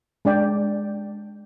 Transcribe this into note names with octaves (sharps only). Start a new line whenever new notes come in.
G#3 D4 D5 G5